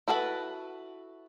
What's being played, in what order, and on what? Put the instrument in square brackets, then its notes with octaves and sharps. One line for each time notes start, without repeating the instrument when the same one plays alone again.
[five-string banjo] E4 F#4 A4 B4